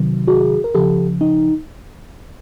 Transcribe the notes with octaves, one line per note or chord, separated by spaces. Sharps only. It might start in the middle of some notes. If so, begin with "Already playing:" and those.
Already playing: C3 D#3 F#3
F#4 G#4
A#4
C#3 F3 G4 A4
D#4